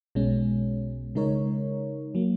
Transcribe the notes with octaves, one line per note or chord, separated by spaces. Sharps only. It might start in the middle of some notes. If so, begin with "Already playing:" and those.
B1 B2 G#3 C#4
C#3 G#3 D#4 A#4 C#5
F#3 A#3